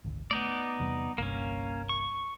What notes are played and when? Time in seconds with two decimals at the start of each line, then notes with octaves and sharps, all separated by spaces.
0.04 G#1 D2
0.31 A3 B3 D#4 D5
0.80 E2 C3 G3
1.18 G1 C2 G2 A#3 C#4
1.89 C#6